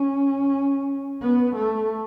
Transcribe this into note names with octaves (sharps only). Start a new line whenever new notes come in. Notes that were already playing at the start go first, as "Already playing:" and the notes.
Already playing: C#4
B3
A3